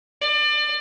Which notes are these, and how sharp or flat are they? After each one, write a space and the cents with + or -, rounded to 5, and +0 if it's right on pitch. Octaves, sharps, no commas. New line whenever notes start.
D5 +30